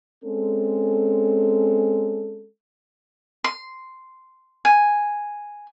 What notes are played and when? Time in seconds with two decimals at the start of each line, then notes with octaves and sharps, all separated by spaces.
0.24 G#3 C4 C#4 A4
3.44 C6
4.65 G#5